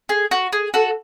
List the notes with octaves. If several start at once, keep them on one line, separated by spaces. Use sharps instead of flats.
G#4
F#4
G#4
F#4 A4